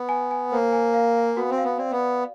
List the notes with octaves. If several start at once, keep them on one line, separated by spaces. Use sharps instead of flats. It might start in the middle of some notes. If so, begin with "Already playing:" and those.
Already playing: B3
G#5
G#5
A#3 C5
G#5
F5
F5
B3 F#4
C4
F5
B3
C4 D5
B3
D5